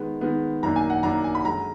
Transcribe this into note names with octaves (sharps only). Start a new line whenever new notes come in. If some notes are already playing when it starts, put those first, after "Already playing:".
Already playing: D#3 G#3 B3
D#3 G#3 B3
F#2 D#3 A#3 D4 A#5
G#5
F#5
F#2 D#3 A#3 D4 A#5
G#5
B5
F#2 D3 G#3 A#5